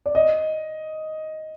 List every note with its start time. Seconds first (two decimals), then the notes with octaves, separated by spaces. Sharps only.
0.06 D5
0.15 D#5